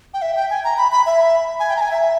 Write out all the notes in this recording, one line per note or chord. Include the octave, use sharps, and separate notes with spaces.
G5
E5
G5
G#5
A#5
B5
B5
E5
G#5
G5
A#5
G#5
E5